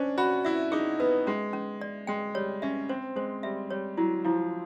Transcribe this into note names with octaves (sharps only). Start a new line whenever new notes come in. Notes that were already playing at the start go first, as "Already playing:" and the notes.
Already playing: C#4 D4 C5
F#4 B5
E4 E5
D#4 G#4
B3 B4
G#3 C#4
C#4
D5
G#3 G5
G3 C#5
C#4 E5
C4 C5
G#3 C5
G3 E5
G3 C#5
F#3 E4
F3 E4